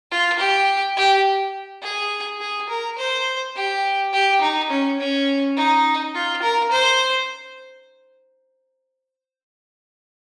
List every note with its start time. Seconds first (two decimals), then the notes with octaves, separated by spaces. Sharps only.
0.11 F4
0.39 G4
0.97 G4
1.83 G#4
2.40 G#4
2.69 A#4
2.98 C5
3.56 G4
4.13 G4
4.42 D#4
4.70 C#4
4.99 C#4
5.56 D#4
6.15 F4
6.42 A#4
6.72 C5